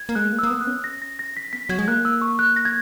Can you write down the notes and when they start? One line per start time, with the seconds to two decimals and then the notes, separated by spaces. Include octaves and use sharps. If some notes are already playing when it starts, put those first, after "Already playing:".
Already playing: G#6
0.09 A#3
0.15 G#3 F#6
0.33 A#3
0.39 E6
0.43 A#3
0.47 D#6
0.50 B3 E6
0.61 F#6
0.67 C#4
0.84 A#6
1.02 A#6
1.19 A#6
1.37 B6
1.53 B3 B6
1.69 F#3 G#6
1.79 G#3
1.88 A#3 F#6
2.05 E6
2.21 C#6
2.39 F#6
2.56 A#6
2.65 G#6